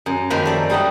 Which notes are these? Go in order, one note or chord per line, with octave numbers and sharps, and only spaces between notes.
F#2
F#2 D#3 F3 A#3 B4
A3 D5
G3 D#4 D#5 F#5